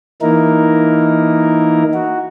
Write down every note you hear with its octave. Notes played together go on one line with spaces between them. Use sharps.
E3 A#3 D#4 E4 A#4
F#4